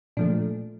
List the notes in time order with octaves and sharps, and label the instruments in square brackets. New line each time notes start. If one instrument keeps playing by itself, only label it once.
[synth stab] A#2 F3 A3 D4